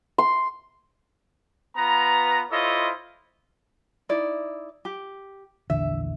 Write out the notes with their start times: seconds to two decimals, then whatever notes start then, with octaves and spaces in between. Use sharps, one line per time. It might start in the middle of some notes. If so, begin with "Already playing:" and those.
0.18 C6
1.76 B3 F4 B4 A#5
2.51 E4 F4 A4 C5 C#5 D#5
4.09 D#4 E4 D5
4.85 G4
5.70 A#1 E2 D3 E5